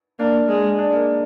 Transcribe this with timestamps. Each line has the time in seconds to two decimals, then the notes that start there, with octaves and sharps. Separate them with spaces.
0.19 A#3 D4
0.49 G#3
0.79 D4
0.93 A#3